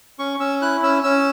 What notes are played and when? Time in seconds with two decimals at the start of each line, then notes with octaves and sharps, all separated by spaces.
0.19 C#4 C#6
0.40 C#4 E6
0.62 E4 F#6
0.83 C#4 E6
1.03 C#4 E6